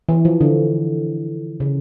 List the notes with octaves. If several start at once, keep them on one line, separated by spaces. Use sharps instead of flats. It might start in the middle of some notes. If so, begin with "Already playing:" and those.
E3
F3
D3
C#3